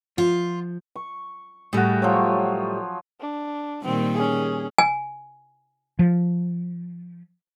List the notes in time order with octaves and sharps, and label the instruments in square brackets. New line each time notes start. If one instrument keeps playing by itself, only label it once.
[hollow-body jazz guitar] F3 [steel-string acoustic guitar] F4
[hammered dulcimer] C#6
[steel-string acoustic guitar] A2 G3 [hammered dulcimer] F#4 G#4
[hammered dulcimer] F3 F#3 C#5
[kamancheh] D4
[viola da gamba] A#2 D#3 G3 [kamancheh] C4
[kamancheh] C#4 G#4
[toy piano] G#5
[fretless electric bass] F3